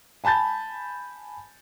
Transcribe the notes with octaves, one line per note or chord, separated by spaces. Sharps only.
G#5 A5 B5 G6 A6